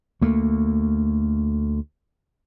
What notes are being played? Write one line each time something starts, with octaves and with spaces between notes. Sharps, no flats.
D2 A3 A#3